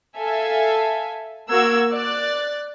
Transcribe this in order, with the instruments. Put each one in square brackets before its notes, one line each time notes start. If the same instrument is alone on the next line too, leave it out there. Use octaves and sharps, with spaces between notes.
[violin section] A4 E5 F5 G#5
A#3 F#4 A#4 F#5 E6 G#6
D5 F#6 A6